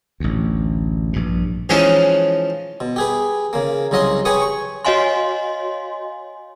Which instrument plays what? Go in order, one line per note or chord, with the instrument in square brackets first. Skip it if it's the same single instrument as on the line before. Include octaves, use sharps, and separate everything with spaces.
[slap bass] A1 D2
A#1 G2
[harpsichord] E3 F3 G#3 C#4 D#4
B2
G4 G#4 B4
C#3 A#3
C2 C#3 F#3 D#5 F5 C6
G4 G#4 B4 C#5 C#6 D#6
C#6
[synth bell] F#4 C#5 D#5 F5 G#5 C6